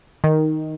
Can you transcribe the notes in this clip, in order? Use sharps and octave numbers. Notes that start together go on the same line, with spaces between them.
D#3